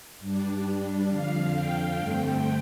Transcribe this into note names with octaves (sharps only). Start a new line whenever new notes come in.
G2 G3 D4
F2 D3 F3 F5
G5
G2 D3 A3 C4